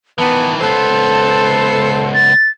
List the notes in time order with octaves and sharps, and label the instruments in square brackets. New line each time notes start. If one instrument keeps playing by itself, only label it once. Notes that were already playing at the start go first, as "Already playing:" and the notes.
[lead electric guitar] D#3 E3 [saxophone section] B3 [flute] A5
[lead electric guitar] C#2 B3 [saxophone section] A4 C5 [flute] A5
[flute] A6